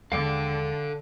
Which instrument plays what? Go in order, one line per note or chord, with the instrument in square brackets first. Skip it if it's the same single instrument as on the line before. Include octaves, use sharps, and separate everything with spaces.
[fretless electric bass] D#2 G#3 [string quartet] D3 [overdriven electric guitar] A4 D5 [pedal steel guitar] F5 G5 D6